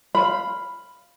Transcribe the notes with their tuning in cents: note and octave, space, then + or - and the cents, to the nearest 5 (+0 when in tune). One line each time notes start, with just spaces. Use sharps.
F5 +0 B5 +0